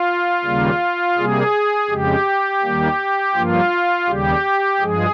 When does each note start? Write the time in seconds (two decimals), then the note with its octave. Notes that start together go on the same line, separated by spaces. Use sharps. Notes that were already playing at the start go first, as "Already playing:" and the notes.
Already playing: F4
0.45 D#2 C#3 G3 A#3
1.17 C3 G3 A#3 G#4
1.89 F2 C#3 G#3 G4
2.62 D#2 D#3 G3 A#3
3.35 G2 F3 A#3 F4
4.08 D#2 C#3 G3 G4
4.80 G2 F3 G#3 G#4